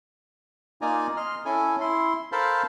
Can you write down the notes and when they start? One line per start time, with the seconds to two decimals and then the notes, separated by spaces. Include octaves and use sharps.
0.81 A#3 D#4 F4 D5 G#5 A#5
1.17 D#5 C6 F6
1.45 C#4 E4 A4 G#5
1.81 E4 C6
2.32 A4 A#4 C5 F5 A5 B5